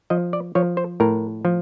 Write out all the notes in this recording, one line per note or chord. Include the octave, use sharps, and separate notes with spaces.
F3 D#5
D5
F3 C#5
C5
A2 A#4
F3